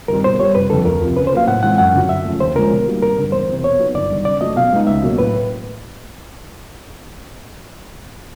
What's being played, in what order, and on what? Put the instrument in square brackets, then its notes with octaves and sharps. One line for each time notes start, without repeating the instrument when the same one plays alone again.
[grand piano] G2 D#3 G3 C4 [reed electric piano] A#4
[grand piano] B2 [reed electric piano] C5
[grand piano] G3 B3 [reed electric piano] C#5
[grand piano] F1 [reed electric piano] B4
[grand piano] F2 D3 [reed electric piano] A4
[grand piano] D2 [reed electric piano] A#4
[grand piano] C3 F3
[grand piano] C#3 [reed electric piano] B4
[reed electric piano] C5
[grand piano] F#3 A#3 [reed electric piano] F5
[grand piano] A2 [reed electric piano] F#5
[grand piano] E3 G#3 C4 E4 [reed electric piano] F#5
[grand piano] F#2 [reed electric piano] F#5
[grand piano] D3 F#3
[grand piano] F#2 [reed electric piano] E5
[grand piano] C#3 F3 A3
[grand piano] D#2 [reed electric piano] C5
[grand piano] D3 F3 G#3 C#4 [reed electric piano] A#4
[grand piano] B2
G3 A#3 D#4 F#4
[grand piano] G#1 [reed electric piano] A#4
[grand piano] G2 D3
[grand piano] E2 [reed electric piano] C5
[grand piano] C3 E3
[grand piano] B2 [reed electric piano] C#5
[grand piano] F#3 B3 D#4
[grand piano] G1 [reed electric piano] D5
[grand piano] G2 D#3
[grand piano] C#3 [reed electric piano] D5
[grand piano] F#3 A3 [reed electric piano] D#5
[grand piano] B2 [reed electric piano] F5
[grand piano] G#3 B3 D#4
[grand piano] C#2 [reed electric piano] E5
[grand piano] B2 F#3 A#3
[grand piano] A2 [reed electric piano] B4